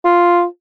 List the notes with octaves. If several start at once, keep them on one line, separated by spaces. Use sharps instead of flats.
F4